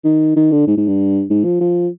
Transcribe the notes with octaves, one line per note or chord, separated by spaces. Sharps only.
D#3
D#3
D3
G#2
G#2
G2
G#2
F3
F3